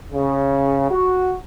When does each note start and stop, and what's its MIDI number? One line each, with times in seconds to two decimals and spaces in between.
0.12 0.88 49
0.90 1.35 66